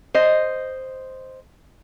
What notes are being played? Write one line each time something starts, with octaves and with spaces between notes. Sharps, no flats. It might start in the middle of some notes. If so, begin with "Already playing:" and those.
C5 D#5